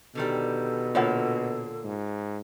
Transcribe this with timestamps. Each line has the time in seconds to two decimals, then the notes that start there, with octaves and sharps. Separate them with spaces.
0.15 B2 D3 D#3 G3 A4
0.95 A#2 D3 A#3 F4 C#5 F#5
1.84 G#2